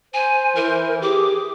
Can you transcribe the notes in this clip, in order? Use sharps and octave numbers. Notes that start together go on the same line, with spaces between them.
C5 G#5
E3 A#4
G4 G#4 D6